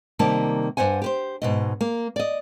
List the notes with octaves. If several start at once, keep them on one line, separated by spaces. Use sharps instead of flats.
C3 D#3 G3 A#3 A5
G2 F3 C5 F#5 G#5
G4 B4 C5
G#2 B2 D#5
A#3
D5 D#5